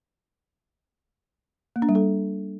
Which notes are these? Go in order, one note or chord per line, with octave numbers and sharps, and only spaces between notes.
A#3
D4
G3
A4